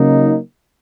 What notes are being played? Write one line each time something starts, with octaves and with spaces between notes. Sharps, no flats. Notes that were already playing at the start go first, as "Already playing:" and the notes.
Already playing: C#3 F#3 A#3 D#4